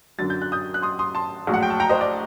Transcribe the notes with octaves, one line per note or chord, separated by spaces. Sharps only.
F#2 D3 F#3 A6
G6
F#6
D#6 G6
F#6
C6 D#6
C6 D#6
A5 C6
A#1 A2 F#3
F#5
G5
A5
G5 A#5
C5 D#5
D5